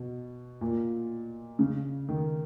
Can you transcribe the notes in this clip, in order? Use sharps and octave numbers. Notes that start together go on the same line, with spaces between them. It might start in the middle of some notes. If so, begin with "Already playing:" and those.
Already playing: B2
A#2
C#3
D#3